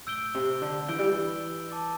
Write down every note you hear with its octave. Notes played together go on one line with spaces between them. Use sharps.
A2 E6 G6 D7 G7
C3
D3
E3 E6 G6 D7 G7
G3
E3
A5 D6 A6